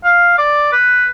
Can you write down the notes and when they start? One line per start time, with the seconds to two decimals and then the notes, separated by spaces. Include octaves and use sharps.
0.04 F5
0.38 D5
0.73 B4